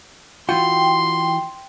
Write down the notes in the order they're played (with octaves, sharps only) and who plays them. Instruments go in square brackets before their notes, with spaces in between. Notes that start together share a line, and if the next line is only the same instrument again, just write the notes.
[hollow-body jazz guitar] E3 F4 F#4 [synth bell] G5 [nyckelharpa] C6